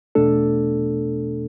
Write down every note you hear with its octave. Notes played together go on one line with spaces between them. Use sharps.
E2 B2 A3 D4 A4